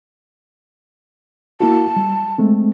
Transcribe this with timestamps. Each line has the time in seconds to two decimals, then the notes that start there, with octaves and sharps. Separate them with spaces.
1.60 A#3 E4 F#4 A5
1.97 G3
2.38 G#3 A3 C4